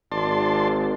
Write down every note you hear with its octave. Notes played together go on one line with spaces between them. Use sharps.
G#1 D5 A5 C6